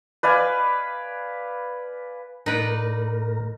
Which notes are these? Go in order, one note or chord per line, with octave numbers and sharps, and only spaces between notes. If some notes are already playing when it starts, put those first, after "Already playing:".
B4 D5 F5 G#5
A2 D#4 A#4 B4 D5